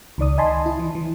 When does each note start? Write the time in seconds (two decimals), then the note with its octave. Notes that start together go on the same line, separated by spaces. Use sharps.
0.18 C#2 D#3 D5 D#6
0.38 D#5 G#5 A5 B5 C6
0.66 E4
0.79 E3
0.95 E3